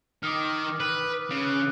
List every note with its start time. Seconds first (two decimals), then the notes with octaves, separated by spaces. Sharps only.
0.23 D#3 D6 D#6 F6
0.80 B4
1.30 C#3
1.45 F6 F#6